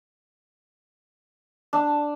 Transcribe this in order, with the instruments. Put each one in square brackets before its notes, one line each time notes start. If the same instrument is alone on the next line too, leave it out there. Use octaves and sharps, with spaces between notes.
[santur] D4